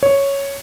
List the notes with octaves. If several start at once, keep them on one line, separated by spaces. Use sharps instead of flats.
C#5